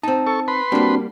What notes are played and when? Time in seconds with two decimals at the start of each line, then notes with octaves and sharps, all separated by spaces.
0.03 C4 D#4 A5
0.27 A4 C#6
0.48 B4 B5 C6
0.72 G3 A#3 C4 D4 F#4